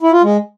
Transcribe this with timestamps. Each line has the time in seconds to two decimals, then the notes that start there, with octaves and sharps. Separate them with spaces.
0.01 E4
0.12 F4
0.23 G#3